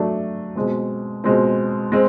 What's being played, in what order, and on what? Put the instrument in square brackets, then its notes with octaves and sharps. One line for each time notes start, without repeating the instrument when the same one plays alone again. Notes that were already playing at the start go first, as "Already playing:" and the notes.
Already playing: [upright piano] F#3 A3 D4
B2 G#3 C4
B2 G#3 C4
G#3 C4